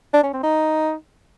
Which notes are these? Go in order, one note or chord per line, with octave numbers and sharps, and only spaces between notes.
D4
C#4
C4
D#4